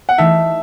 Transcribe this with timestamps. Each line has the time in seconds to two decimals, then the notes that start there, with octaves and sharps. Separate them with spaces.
0.09 F#5
0.18 E3 A3 D#4 A4 E5